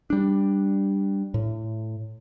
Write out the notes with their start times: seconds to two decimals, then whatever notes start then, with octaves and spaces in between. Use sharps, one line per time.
0.10 G3 D4
1.34 A2